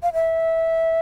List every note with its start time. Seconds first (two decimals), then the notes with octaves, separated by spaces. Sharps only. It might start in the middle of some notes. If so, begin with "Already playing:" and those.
0.03 F5
0.13 E5